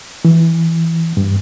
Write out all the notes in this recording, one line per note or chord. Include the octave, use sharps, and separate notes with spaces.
E3
G2